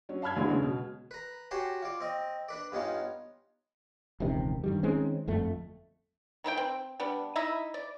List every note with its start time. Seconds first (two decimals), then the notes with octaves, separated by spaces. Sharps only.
0.09 F#3 C#4
0.22 F5 A5 B5 F6 G#6
0.36 E2 D3 F#3 G#3
0.50 C#3 G#3
0.63 B2
1.11 B4 A#5
1.51 F#4 G4 C#5 G#5 A5 C6
1.82 F4 D5
2.00 C4 D#5
2.48 D4 B4 D5
2.72 G2 B3 C#4 D#4 F4
4.20 E1 C#2 C3 D#3
4.64 G2 D#3 G3
4.83 D#3 G#3 C4 C#4
5.27 G1 F2 A3
6.44 D#3 E3 D#4 G5
6.57 C4
7.00 G3 B3 D4
7.35 D#4 E4 D#5 E5
7.74 D5